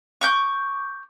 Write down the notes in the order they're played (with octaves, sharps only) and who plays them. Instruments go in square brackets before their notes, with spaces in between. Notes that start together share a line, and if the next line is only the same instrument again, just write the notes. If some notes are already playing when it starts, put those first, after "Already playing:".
[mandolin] C#6 D6 G6